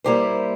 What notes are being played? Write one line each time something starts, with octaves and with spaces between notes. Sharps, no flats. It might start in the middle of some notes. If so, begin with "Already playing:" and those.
G3 A#3 E4 G4 C5